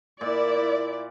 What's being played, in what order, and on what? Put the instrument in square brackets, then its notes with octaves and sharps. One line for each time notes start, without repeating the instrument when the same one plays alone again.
[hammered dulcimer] A#2 [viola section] E4 D5